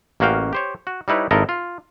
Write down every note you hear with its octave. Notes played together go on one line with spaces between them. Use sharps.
A1 A#3 C#4 F#4 F5 G5
G4 C5 C#5
F#4
G3 D#4 E4 B4 C#5
G#1 E4 F4 A4 A#4 D#5
F4